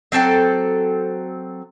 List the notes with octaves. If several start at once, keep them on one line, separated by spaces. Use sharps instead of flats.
F#3 C4 A4 G5